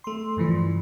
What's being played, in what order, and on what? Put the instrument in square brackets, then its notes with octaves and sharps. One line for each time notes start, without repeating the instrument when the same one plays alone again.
[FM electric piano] A3 C6
G2 C#3 E3 F3